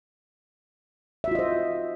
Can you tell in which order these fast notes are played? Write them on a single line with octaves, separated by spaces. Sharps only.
E5 F#4 F4 D#5 C5